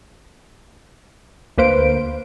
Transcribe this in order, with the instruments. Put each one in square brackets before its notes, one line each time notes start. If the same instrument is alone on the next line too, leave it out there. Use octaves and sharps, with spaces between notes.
[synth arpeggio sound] D2 A#3 B4 C5 F5 D7